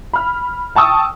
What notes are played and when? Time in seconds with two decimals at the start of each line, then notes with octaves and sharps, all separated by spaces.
0.13 B5 F6
0.75 G5 A5 C#6 D#6 E6